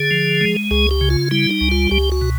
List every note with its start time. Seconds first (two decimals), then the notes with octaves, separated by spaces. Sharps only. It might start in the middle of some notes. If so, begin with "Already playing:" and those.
Already playing: D3 G#4
0.11 F3
0.41 G#3
0.71 C#2 G#4
0.91 G4
1.01 C#3
1.10 F4
1.31 G3 E4
1.51 D#4
1.61 C#2
1.71 F4
1.91 C#2 G4
2.12 F#4
2.21 B2